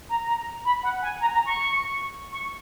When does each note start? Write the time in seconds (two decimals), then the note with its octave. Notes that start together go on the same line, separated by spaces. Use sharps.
0.09 A#5
0.28 A#5
0.65 B5
0.83 F#5
1.02 G#5
1.21 A#5
1.34 A#5
1.46 C#6
2.32 C#6